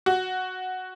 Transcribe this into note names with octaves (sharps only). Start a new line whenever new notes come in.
F#4